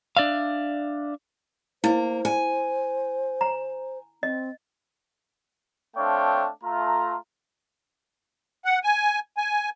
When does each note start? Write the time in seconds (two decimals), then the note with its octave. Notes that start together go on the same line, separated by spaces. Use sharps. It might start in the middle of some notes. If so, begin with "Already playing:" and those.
0.17 D4 D5 E5 F5
1.84 A#3 E4 C5
2.25 G#5
3.41 A#5
4.23 C4 D#5
5.97 A3 C4 D4 C#5 F5 G5
6.64 A3 F4 A#5
8.65 F#5
8.83 G#5
9.37 G#5